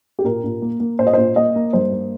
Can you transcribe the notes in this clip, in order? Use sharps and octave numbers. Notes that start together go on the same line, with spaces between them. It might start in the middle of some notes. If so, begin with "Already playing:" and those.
G4
A#2 A#4
A#2
A#3
A#3
A#2 C5
D#5
A#2 C5
A#3 D#5
A#3
G2 C5
A#3